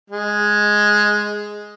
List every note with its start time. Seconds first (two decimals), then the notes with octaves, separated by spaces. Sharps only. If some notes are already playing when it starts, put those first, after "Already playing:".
0.10 G#3